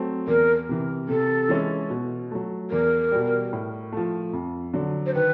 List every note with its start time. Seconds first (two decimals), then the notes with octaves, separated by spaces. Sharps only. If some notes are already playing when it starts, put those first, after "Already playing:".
Already playing: F#3 A3 C4
0.27 E2 A#4
0.69 C3 E3
1.09 C3 A4
1.49 E3 G#3 C#4 E4
1.90 B2
2.31 F#3 A3
2.71 E2 A#4
3.12 B2 G3
3.53 A2
3.92 F3 A3
4.33 F2
4.74 D3 F#3
5.06 C5
5.15 D#3 B4